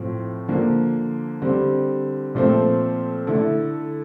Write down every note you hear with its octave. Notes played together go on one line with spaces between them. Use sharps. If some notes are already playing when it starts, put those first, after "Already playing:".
Already playing: A2 F3 C4 F4
D3 F3 A#3
D3 G3 C4
A#2 F3 A3 C4
D3 A3 E4